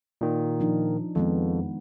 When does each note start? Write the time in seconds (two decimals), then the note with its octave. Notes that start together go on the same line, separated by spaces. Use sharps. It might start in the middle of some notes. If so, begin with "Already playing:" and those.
0.21 A#2 D#3
0.60 F3 D4 D#4
1.15 F2 D#3 G#3 B3